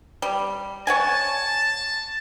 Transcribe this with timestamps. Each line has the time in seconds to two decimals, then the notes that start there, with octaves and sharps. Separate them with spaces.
0.22 G3
0.87 C#5 F#5 G#5 A5